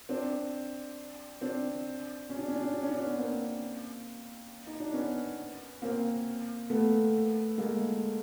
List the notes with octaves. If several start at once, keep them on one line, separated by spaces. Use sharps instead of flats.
C4 D4
C4 D4
C#4
D4
C#4
D4
C#4
D4
C#4
D4
B3 C#4
A#3 C4
D#4
D4
B3 C#4
A#3 C4
A3 B3
G#3 A#3